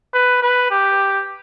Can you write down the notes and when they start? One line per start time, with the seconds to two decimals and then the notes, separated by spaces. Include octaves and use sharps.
0.14 B4
0.42 B4
0.71 G4